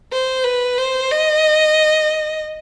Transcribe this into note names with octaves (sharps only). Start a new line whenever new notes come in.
C5
B4
C5
D#5